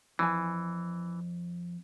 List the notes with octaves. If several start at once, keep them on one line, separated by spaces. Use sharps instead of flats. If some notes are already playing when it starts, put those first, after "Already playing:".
F2 E3 G#5